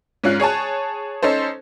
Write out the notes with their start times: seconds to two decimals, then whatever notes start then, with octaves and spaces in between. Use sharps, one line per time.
0.24 G#2 C#4 F4 F#6
0.40 G#4 C#5 G#5 A5
1.23 C#4 D#4 A4 C5